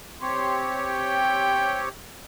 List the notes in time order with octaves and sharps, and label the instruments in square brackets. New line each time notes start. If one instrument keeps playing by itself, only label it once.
[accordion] C4 G4 C#5 [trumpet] C6
[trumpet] G5